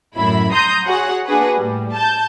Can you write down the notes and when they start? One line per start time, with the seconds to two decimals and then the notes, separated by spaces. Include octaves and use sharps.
0.15 F#2 A2 E4 B5
0.52 A#5 C6 D#6 G6
0.85 F#4 G#4 C#5 F#5
1.26 A#3 D4 F#4 G#4 B4 F#5
1.57 A2 G3
1.93 A5 G6